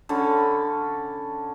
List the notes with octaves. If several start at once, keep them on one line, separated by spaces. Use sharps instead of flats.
D3 C#4 B5